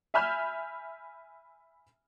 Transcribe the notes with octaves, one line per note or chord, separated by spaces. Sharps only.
E5 G#5 B5 F6 G6 E7